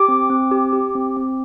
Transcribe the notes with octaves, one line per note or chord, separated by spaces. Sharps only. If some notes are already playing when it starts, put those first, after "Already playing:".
Already playing: G4 D6
C4
C4
G4
G4
C4
C4